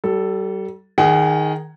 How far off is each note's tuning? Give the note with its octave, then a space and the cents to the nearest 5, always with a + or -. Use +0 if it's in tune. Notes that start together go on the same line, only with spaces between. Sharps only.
G3 -35 A4 +0
D#3 +0 G#4 +0 F#5 +40